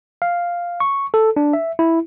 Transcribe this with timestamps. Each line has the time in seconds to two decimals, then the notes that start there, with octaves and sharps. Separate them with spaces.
0.22 F5
0.80 C#6
1.14 A4
1.37 D4
1.53 E5
1.79 E4